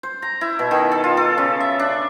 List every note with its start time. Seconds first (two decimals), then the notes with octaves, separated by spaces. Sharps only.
0.03 C5
0.22 A#5
0.41 E4
0.59 B2
0.71 D#3
0.92 A4
1.04 F4
1.17 A4
1.38 C#3
1.61 E5
1.79 D4